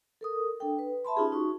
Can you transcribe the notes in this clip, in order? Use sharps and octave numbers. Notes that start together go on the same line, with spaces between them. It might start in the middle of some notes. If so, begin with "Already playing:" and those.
A4 A#4 D#6
D4 A4 G5
B4
E5 A5 B5 C6
C#4 D#4 F4 G4 G#4
D#4 F#4 C#6